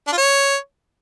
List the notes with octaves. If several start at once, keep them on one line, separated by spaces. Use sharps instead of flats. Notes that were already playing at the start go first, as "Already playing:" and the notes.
D4
F4
C#5